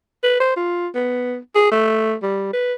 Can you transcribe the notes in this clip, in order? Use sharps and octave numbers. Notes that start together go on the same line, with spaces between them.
B4
C5
F4
B3
G#4
A3
G3
B4